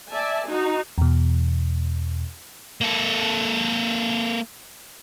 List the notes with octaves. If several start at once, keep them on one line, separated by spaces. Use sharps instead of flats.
D5 E5 G#5 A5
D#4 F#4
E2 B2
A#3 A4